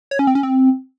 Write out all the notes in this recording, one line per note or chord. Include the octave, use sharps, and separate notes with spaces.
C#5
C#4
C4
C#4
C4